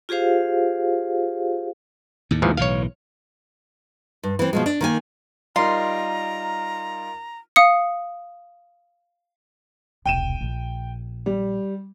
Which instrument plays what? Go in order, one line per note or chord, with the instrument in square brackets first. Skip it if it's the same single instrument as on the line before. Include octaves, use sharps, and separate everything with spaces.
[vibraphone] F4 G4 G#4 C5 F5
[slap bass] D#2 A2
[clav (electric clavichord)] G#2 E3 F3
[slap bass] B1 A2 E3 [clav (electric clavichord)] C#5 F5
[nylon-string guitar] G2
E3 C4
B2 F3 G#3
D4
D#3 A#3 G#5
[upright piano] G3 D#4 [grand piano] F4 A#4 [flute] A#5 [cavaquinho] C6
[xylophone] F5 D#6 C#7
[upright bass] E1 C2 [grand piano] G5 D#7 E7
[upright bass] A#1
[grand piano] G3